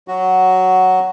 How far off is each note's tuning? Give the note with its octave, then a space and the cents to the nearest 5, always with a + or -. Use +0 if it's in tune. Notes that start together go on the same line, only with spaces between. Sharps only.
F#3 +0 F#4 +5